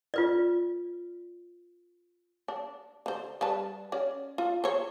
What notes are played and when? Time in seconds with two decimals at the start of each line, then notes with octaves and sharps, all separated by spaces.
0.14 F4 B4 D5
2.48 D4
3.06 D3 C5
3.41 G3 B4 A5
3.92 C#4 D5
4.38 F4
4.64 C5 C#5